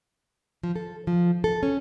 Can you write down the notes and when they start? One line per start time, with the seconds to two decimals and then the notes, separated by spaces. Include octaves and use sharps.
0.63 F3
0.76 A4
1.07 F3
1.44 A4
1.63 C#4